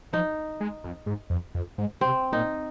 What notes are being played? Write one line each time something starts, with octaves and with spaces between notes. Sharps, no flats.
F3 D#4
G#3
F2
G#2
F2
F2
G#2
C3 C4
A#2 D#4